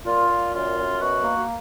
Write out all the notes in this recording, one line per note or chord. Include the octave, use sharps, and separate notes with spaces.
A#2 F4
A#2
F#2 F4
F#2
B2 F#4
A#3